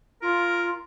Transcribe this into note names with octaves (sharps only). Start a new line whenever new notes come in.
F4 A#4